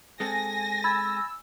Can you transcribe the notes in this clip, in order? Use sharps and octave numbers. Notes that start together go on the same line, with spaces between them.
G#3 C4 A4 G#5 A#6
B5 E6 G#6 A6